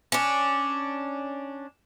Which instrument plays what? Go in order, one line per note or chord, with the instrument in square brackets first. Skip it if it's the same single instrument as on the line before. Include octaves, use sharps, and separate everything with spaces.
[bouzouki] C#4 D4